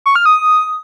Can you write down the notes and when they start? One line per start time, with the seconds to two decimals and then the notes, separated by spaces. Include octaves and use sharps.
0.06 C#6
0.16 F6
0.26 D#6